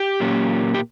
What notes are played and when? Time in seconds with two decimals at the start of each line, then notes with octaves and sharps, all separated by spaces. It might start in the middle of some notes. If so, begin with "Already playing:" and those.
Already playing: G4
0.20 A#2 F#3 A#3 C#4
0.74 G4